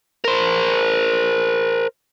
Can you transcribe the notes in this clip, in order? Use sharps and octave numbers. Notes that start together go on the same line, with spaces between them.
A#4 C5